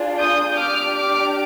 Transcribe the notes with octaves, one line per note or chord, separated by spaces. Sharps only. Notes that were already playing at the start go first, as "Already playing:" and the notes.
Already playing: D4 F4 G#4
D#6 G6
D4 G4 D6 F6
D6 F6